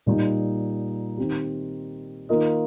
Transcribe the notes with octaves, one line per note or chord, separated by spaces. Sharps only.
A#2 G3 D#4
D#3 C4 G4
D#3 A#3 F4 A#4 D#5